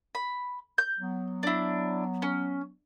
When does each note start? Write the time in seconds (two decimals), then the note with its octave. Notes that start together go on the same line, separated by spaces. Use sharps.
0.15 B5
0.78 G6
0.99 F#3 B3
1.43 D4 E4
2.22 C#4